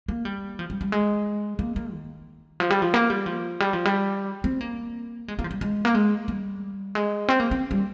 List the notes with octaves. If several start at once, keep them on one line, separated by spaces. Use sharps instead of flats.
A#3
G3
F3
G3
G3
G#3
A#3
A#3
D#3
F3
G3
F3
A#3
G3
F3
G3
F3
G3
C4
A#3
G#3
A#3
F3
G3
G#3
A#3
G#3
G3
G#3
C4
A#3
C4
G3